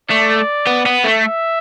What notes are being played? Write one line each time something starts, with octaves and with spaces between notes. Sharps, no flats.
A3 D5
B3
B3
A3
E5